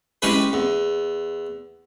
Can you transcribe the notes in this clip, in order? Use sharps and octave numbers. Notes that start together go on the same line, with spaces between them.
E3 G#3 C#4 G4 G#4 B4
E2